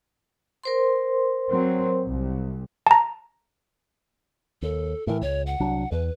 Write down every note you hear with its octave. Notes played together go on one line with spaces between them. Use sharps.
A#4 C5 C6
F#3 C4
C2
A5 A#5
D#2 A4
A2 E3 A#4
C#2 C#5
F#5
C2 F#3 D4
E2 B4